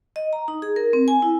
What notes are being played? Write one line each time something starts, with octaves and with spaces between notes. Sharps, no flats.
D#5
A#5
D#4
G#4
A#4
C4
G#5
E4